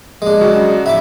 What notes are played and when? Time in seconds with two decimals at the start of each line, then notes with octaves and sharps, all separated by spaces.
0.22 G#3 D4
0.41 C#3 F#3 F#4
0.86 E4 E5 D6